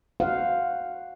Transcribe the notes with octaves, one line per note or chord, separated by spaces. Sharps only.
F#4 C5 F5 F#5